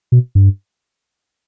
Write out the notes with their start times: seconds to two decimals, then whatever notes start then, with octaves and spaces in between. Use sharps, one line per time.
0.12 B2
0.35 G2